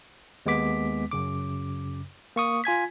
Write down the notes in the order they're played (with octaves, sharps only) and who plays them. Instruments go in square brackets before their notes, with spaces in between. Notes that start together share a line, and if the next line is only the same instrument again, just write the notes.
[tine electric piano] D#2 G#3 B3 D6 B6
F#2 C#3 D6
A#3 C#6 D#6
F4 G#5 G#6 B6